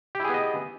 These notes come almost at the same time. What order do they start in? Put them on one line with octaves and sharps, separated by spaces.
G4 E4 G#4 B3 D#5